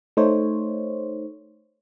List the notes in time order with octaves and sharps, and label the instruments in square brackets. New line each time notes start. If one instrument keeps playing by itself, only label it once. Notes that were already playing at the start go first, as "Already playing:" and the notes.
[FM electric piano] A3 D#4 C5 C#5